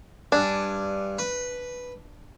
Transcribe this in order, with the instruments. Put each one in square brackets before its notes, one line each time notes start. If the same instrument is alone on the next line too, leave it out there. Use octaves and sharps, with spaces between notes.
[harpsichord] G2 G#5 [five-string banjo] D4
[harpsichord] B4